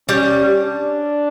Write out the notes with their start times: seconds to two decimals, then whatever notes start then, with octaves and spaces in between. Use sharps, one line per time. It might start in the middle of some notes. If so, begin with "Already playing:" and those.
0.09 G3 C#4
0.63 D4